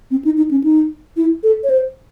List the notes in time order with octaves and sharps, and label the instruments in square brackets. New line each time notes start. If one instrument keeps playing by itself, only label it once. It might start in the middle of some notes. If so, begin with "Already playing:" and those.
[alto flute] C4
D#4
D#4
C#4
D#4
E4
A4
C#5
C5